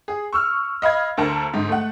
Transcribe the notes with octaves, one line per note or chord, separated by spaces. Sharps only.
G#4
C#6 E6 F6
D#5 F5 B5 G#6
D2 D3 A#4 C5 A5 A#5
G#2 D3
A3 F#5